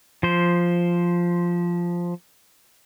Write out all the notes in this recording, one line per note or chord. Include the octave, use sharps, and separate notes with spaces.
F3 C5